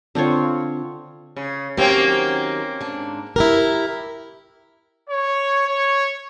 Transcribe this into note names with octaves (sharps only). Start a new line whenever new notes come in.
D3 C4 F4 C#5
C#3
D#3 F#3 A#3 C4 C#4 G4
G#2 D4
E4 G4 A#4
C#5
C#5